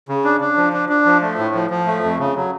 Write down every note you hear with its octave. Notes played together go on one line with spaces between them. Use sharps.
C#3
D4
D4
F3
D4
D4
F3
A3
A2
F3
F3
A3
F2
C#3
F#3